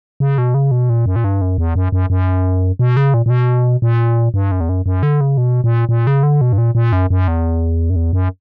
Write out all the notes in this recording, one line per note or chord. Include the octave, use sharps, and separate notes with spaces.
C#3
B2
C#3
B2
A#2
F#2
A#2
G2
F#2
E2
F#2
F#2
F#2
B2
C#3
A#2
A#2
B2
A#2
G2
F#2
E2
F#2
F#2
D3
C#3
B2
A#2
A#2
C#3
D3
B2
G2
A#2
A#2
F#2
F#2
E2
F#2
E2
F#2